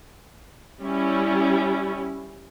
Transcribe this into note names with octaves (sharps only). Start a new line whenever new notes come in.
G3 C#4 E4